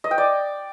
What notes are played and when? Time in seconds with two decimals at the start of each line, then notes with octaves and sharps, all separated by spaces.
0.04 D#5
0.11 G5
0.18 D5